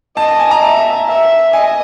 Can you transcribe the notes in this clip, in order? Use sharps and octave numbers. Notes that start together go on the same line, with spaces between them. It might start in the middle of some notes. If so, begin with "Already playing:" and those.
D#5 A5
A5
G#5
A#5
E5 A5
E5
D#5 G#5